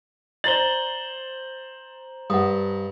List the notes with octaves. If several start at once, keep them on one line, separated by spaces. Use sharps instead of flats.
C5 D5 A#5 A6 F#7 G7
G2 F#5 D#6